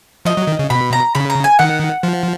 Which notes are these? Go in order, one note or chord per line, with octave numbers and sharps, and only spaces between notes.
F3 D#5
F#3
D#3
C#3
B2 B5
A#5
C#3 B5
A#5
G#5
D#3 F#5
F3